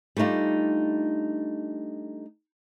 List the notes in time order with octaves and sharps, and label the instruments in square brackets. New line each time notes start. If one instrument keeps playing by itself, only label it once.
[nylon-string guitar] G3 A3 D4 D#4 F4